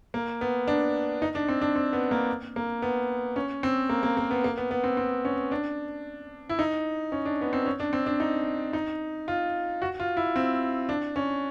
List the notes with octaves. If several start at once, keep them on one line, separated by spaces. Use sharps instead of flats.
A#3
B3
D4
D#4
D4
C4
D4
C4
B3
A#3
A#3
B3
C#4
C4
A#3
A#3
A#3
B3
A#3
B3
B3
C4
C4
C#4
D4
E4
D#4
C#4
D4
B3
C4
C#4
D4
C4
D4
D#4
D#4
F4
F#4
F4
E4
C4
D4
C#4